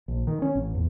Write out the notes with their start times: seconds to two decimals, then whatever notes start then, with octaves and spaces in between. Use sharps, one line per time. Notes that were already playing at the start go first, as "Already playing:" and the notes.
0.08 A#1
0.27 D#3
0.42 C#4
0.55 A1
0.75 E2